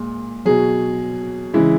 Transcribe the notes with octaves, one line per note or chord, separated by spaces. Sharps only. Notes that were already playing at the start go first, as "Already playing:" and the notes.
Already playing: A#2 G#3
B2 F#3 G#4
C#3 E3 G#3 E4